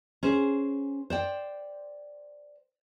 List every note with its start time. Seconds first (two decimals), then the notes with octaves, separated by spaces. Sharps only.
0.23 C#4 G#4 C5
1.10 C5 D5 G5